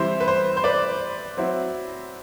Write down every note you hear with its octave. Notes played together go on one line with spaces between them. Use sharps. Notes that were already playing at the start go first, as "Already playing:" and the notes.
Already playing: E3 G3 C4 E4 C5
B4
C5
C5
B4 D5
F#3 C4 E4